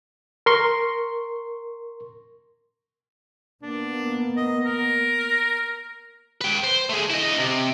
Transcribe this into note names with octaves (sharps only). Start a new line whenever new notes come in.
A#4 C6 C#6
A#3 B3 D4
D#5
A#4
B4 G5
C5
A3 G#4
E4 D#5
C3